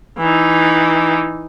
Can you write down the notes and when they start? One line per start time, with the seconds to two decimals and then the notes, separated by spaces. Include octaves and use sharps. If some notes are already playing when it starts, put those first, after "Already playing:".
0.19 E3 D#4